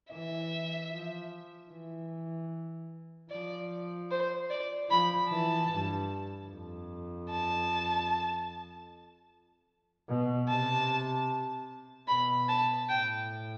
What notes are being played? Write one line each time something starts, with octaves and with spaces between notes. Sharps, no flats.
E3 E5
F3
E3
F3 D5
C5
D5
F3 B5
E3 A5
G2
F2
A5
B2
C3 A5
B2 B5
A5
A2 G5